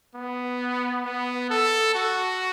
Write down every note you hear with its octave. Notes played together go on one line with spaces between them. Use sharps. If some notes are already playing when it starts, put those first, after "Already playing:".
B3
B3
A4
F#4